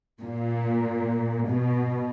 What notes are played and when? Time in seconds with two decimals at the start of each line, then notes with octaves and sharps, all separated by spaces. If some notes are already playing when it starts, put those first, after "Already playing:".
0.21 A#2
1.48 B2